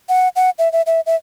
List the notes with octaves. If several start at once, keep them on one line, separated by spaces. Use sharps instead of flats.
F#5
F#5
E5
E5
E5
E5